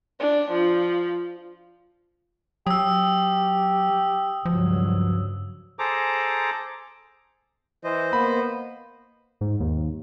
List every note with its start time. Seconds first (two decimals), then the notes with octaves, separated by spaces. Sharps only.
0.20 D4
0.52 F3
2.67 F#3 G4 D#6 E6
4.45 C#2 G2 F3 F#3
5.79 G#4 A4 C5 A#5 D6
7.84 E3 C5 D#5
8.13 A#3 B3 B5
9.41 G#2
9.60 D#2